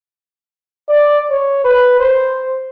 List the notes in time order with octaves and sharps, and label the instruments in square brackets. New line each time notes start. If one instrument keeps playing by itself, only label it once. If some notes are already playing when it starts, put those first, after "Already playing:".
[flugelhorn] D5
C#5
B4
C5